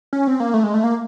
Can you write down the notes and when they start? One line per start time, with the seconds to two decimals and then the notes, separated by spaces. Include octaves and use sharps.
0.13 C#4
0.27 C4
0.40 A#3
0.54 A3
0.63 G#3
0.74 A3
0.84 A#3